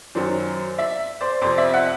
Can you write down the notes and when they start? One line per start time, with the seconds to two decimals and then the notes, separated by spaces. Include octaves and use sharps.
0.15 F#2 D#3 F#3 C5 D5
0.78 D5 E5
1.21 C5 D5
1.42 F2 C3 F3 C5 D5
1.58 D5 E5
1.73 E5 F#5